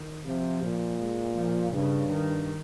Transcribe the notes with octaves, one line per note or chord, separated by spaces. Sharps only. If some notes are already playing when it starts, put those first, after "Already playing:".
Already playing: D#3
C3 F3
A#2
G#3
F3
G2 C#3
D#3